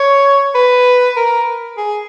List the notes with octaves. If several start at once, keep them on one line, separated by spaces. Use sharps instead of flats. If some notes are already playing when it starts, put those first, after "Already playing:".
Already playing: C#5
B4
A#4
G#4